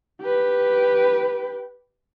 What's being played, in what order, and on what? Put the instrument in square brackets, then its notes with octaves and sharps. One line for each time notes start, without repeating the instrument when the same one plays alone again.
[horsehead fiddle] G4 B4